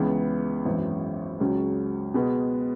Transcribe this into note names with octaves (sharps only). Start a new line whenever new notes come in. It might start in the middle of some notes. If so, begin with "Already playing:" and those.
Already playing: C#2 C#3 E3 B3
G#1 F#2 E3
C#2 C#3 F#3 C#4 F#4
B2 G#3 B3